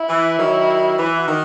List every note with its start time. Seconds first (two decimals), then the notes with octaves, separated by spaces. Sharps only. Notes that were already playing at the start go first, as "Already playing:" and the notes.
Already playing: E4
0.09 E3
0.39 D#3 F#3
0.99 E3 E4
1.18 F#4
1.28 D#3